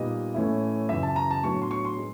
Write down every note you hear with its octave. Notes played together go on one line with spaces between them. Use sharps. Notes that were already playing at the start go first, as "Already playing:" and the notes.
Already playing: A#2 G3 B3 D#4 D#5
A2 E3 A3 C#4 E4
F#2 C#3 E3 E5
A5
A#5
A5
A2 F#3 B3 D4 C#6
C6
C#6
C6
G#3